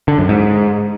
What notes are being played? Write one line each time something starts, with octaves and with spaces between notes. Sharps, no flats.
D3
F#2
G#2